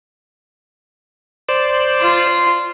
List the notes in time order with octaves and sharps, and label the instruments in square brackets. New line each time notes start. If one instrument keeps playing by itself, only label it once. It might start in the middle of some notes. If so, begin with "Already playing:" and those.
[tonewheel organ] C5 D5
[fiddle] F4